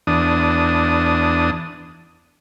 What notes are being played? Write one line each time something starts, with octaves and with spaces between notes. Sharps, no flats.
E2 D4 D#6